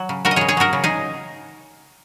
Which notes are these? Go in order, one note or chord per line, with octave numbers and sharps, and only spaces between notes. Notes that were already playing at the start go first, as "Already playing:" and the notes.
Already playing: F#3
C#3
C#3 F#4 A#4
D#5
C#3 G#4 C#5
G#4 C#5
F#3 F#4 A#4
C#3
D#4 G#4